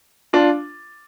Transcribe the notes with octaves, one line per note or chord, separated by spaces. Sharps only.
D4 F4